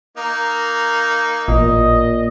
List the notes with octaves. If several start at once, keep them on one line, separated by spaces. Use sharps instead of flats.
A#3 D#4
A1 A#2 D#5